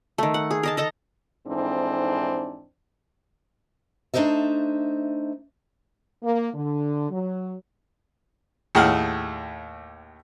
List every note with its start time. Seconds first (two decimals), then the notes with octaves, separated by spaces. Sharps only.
0.18 D#3 A3
0.34 F#5
0.51 G#4
0.63 A#4 D#5 A5
0.77 A4 D#5 A5 A#5
1.48 F2 G#2 E3 C4 D4 D#4
4.14 A3 D4 D#4 C5 D#5 E5
6.23 A#3
6.54 D3
7.10 F#3
8.75 D#2 A2 G#4 F#5 G5 F6